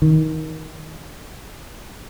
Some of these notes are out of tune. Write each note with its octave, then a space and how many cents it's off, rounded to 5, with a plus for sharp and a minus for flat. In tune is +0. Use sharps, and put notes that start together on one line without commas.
D#3 +20